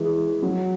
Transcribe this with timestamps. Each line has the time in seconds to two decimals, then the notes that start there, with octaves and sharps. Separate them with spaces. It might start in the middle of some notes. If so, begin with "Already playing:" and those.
Already playing: E3 G#3
0.42 F#3